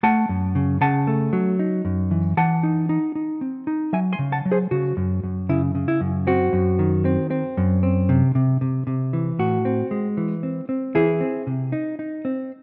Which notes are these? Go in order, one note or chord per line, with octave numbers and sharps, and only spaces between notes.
A3 F#5 A5
F#2
C#3
C#3 F#5 A5
A3
F#3
D#4
F#2
E3
E3 F#5 A5
D#4
D#4
D#4
C4
D#4
F#3 E5 G#5
G#5 C6
C#3
F#5 A5
F#3
G#4 C5
C#3 F#4
F#2
F#2
C#3 E4
C#3
E4
F#2
C4 F#4
F#2
D#3
C4
C4
F#2
C4
C3
C3
C3
C3
E3
A2 F#4
C4
G#3
E3
C4
C4
E3 E4 G#4
C4
C3
D#4
D#4
C4